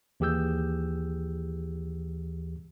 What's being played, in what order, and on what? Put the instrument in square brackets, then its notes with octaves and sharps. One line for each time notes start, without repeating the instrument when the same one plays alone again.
[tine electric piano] D#2 E3 G4 G#4 E6 G6